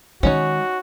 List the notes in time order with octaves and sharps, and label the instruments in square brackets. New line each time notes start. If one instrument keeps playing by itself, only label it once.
[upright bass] D#3 G#3 [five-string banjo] C#4 D#4 C#5 [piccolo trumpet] F#4